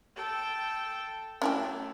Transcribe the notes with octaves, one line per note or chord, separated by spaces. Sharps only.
A4 G5
F#3 A3 C#4 E4 G4